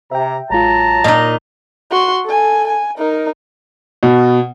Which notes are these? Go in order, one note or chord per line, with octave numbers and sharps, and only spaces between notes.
C3 E5 G5 A#5
A1 F#3 G#3 F4 A5 A#5
A#2 D#4 D#5
F#4 C6
A4 G#5
G#5
D#4 A#4
B2